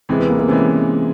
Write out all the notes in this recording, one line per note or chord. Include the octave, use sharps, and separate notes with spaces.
C3 E3 G#3 C4
B3
A#3
A#3
C3 E3 G#3 C#4